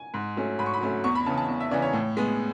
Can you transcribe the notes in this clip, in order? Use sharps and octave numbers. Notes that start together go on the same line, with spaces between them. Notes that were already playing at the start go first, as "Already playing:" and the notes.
Already playing: G#5
G#2
F#3 A3 C#4
G#2 B5
C#6
B5
F#3 A3 C#4
E2 C#6
B5
C#3 E3 A5
A5
E2
E5
C#3 E3 D5
C#5
A2
G#3 B3